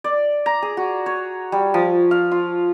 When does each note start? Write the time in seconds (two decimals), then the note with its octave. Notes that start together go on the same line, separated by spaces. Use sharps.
0.04 D5
0.46 A#5
0.62 G#4
0.77 F#4
1.06 C#5
1.52 G3
1.74 F3
2.11 F5
2.31 F4